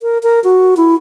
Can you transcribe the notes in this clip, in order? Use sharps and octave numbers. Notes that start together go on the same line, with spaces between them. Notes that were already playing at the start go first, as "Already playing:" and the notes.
A#4
A#4
F#4
E4